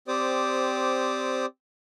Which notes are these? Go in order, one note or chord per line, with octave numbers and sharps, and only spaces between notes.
C4 G4 C5 D5 D6 D#6